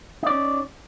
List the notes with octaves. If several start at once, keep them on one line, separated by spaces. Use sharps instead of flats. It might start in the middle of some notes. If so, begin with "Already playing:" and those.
C#4 D#4 D5